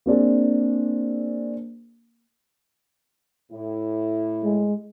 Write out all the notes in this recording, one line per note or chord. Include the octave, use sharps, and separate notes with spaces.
A#3 C4 D4 G#4
A2 E4
G#3